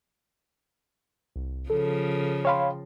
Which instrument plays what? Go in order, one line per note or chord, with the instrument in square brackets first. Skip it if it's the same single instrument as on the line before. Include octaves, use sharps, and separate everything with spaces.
[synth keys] C2
[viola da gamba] C#3 F3 [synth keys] A4
[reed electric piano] C#5 F5 B5 [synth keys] G5 C6